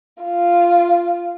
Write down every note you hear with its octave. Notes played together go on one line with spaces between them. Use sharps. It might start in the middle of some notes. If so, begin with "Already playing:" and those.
F4